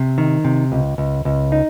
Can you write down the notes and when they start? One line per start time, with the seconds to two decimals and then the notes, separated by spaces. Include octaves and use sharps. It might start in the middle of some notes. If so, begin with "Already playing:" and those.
Already playing: C3
0.18 D#3
0.44 C3
0.72 C#2
0.98 C#2
1.25 C#2
1.52 D#4